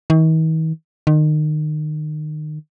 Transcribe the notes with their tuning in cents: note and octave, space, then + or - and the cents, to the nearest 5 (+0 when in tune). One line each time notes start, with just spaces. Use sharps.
D#3 +45
D#3 -30